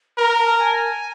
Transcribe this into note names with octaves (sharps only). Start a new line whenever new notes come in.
A#4 A#5
A5
G#5